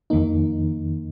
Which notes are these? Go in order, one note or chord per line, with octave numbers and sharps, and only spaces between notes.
F2 D#3 A#3 D#4